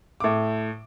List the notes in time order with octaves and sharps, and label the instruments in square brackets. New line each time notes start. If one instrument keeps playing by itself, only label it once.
[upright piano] A2 D6